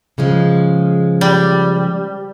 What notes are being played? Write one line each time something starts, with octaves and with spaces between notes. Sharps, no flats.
C#3 F3 G#3
G3